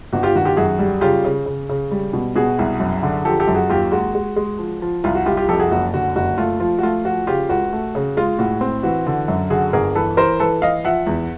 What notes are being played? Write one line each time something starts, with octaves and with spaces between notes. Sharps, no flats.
G1 F#4
F4 G4
D#3 F#4
F4 G4
F#2 F#4 G#4
G3
C#3 F4 G4
C#3
C#3
C#3
G3
B2
B2 F#4 G#4
C2
F#2
D3
F3 G4 A4
G4 A4
F#2
F#4 G#4
D#2 F4 G4
G#3 F#4
G#3
G#3
F3
F3
C2 F4
F#4
C2 F4 G4
F4 G4
F2 G4 A4
F#4 G#4
F#1 F#4
D3 F#4
F#1 F#4
A3 F4
F3 F4
F#4
A3 F4
F3 F#4
C#3 F4 G4
C#2 F#4
A3
C#3
G#3 F4
A2 F#4
C4
E3 F#4
D3
F#2
D3 F#4 G#4
G1 G#4 A#4
E3 A4 B4
E3 A#4 C5
E3 A4 B4
E3 D#5 F5
F3 E5 F#5
E2